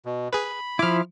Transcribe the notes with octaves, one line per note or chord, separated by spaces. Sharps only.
B2
G#4 B4 B5
F3 E4 D6 F6